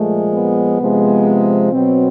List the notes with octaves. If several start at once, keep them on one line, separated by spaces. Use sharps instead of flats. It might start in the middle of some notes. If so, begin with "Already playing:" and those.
Already playing: A#2 F3 G#3 A3
B3
C3 F3 G#3
B2 F#3 C4